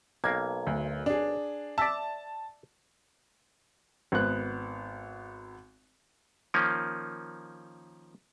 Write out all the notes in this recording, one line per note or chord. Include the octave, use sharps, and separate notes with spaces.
B1 A#3 G#6
D2
D4 G#4
D5 E5 A5
G#1 B3 F#6
D#3 F3 A#3 C#4